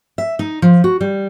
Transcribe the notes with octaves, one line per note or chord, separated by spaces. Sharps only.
E5
D#4
F3
F#4
G3